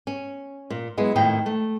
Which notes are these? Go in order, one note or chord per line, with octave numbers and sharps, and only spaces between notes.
C#4
A#2
F#3 G#3 B3 E4
F2 A2 D#3 A#3 G5
A3